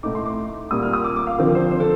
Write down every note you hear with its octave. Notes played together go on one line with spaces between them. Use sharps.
A2 A3 D#4 D6
C6
D6
A#2 G3 A#3 F4 D#6
F6
D#6
D6
D6
F5
D3 F3 C4 A#4
C5
C5
A4